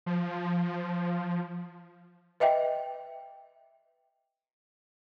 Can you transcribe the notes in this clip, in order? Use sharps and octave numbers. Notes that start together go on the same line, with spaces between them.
F3
B4 D#5 E5 G5